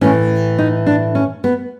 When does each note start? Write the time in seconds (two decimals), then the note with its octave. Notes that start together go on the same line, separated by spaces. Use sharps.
0.01 A2 E3 A3 C#4
0.58 D#4
0.86 D4
1.15 C#4
1.44 B3